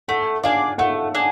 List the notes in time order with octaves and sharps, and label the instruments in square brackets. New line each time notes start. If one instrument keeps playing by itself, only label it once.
[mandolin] A3 [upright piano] F#5
[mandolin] D4 G#4 D5 [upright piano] F5
[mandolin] A3 [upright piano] F#5
[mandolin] D4 G#4